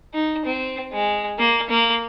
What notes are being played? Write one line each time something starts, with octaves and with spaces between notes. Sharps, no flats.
D#4
C4
G#3
A#3
A#3